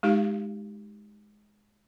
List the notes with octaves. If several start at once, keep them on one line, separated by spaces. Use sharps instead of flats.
G#3 D#4 G4 F5